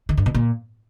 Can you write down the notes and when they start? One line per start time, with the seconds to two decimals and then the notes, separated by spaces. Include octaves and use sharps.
0.09 D#3
0.17 G2
0.26 B2
0.34 A#2